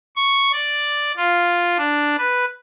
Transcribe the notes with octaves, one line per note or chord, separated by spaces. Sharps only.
C#6
D5
F4
D4
B4